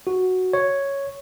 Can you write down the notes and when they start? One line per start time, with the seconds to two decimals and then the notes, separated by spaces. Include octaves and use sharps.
0.07 F#4
0.53 C#5